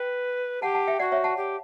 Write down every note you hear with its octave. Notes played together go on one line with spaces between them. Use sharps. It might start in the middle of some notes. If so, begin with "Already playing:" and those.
Already playing: B4 G5
G4 F#5 A5
F#5 A5
E5 G5
F#4 D5 F#5
C#5 E5
F#5 A5
G4